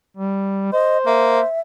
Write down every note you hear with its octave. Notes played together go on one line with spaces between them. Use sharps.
G3
C5 D#5
A#3 E5